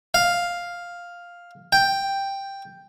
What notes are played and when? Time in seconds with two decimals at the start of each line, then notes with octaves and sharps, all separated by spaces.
0.14 F5
1.72 G5